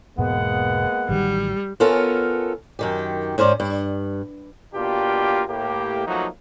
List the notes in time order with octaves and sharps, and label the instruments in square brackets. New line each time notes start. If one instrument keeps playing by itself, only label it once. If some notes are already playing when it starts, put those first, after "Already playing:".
[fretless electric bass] E1 G#2 B2 [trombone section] G#3 A#3 B3 [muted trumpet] F#5
[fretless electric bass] A1 D#3 F#3 [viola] G3
[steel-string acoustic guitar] B3 C#4 F4 A4 A#4
F#2 D#3 G4
G#2 C#4 C5 D5
G2
[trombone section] B2 A#3 D4 F4 G4
A2 A#3 G4
F3 F#3 A3 A#3 D#4 F#4